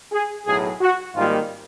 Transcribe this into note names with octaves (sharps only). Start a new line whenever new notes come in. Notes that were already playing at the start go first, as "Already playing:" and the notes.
G#4
B1 A2 F#3 G#4
F#4
G#1 G#2 D#3 G3 A#3 F4